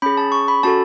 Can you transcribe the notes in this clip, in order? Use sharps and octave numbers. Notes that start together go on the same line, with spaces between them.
C#4 G#4 B5
A5
C#6
B5
C#4 F#4 A4 A5